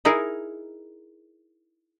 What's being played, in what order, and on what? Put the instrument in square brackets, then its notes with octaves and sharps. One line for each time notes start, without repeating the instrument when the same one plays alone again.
[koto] D#4 E4 G#4 A#4